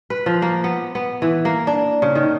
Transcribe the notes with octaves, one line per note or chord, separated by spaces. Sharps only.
B4
F3
A#3
B3
B3
E3
A#3
D4
C#3
D#3